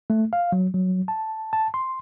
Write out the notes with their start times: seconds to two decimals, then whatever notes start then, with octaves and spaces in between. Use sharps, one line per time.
0.10 A3
0.33 F5
0.52 F#3
0.74 F#3
1.08 A5
1.53 A5
1.74 C6